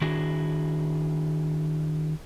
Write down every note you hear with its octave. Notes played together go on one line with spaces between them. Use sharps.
D#3 D4 E4 F#4 G#4